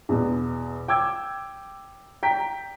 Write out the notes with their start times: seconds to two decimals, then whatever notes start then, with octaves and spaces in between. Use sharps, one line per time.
0.09 E2 B2
0.88 G5 D6 E6 G#6
2.23 G5 A#5 B6